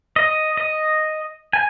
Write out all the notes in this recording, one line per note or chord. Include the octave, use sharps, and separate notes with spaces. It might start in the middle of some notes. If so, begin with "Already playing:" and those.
D#5
D#5
G#5